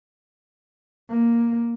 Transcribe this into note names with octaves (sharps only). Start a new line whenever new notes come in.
A#3